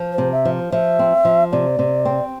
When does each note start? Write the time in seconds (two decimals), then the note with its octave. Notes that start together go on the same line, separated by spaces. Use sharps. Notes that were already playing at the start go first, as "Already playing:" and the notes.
Already playing: F3
0.12 C5
0.18 C3
0.32 E5
0.45 F3
0.72 F3 E5
0.99 C4
1.25 F3
1.52 C3 D5
1.79 C3
2.05 C4